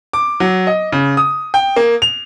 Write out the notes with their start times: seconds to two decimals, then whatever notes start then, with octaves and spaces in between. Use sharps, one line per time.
0.13 D6
0.40 F#3
0.67 D#5
0.92 C#3
1.17 D#6
1.54 G5
1.76 A#3
2.02 F7